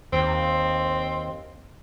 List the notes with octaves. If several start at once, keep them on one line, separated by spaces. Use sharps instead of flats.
D#2 C4